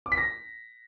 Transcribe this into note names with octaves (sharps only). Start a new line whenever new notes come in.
D6
B6
A#6